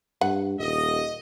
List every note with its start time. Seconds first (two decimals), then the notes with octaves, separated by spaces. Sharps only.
0.21 G2 F#5
0.60 D#1 D#5